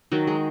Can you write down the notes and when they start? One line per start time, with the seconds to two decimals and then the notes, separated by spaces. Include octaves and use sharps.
0.12 D#3 F#3 F#4
0.27 G#3 G#4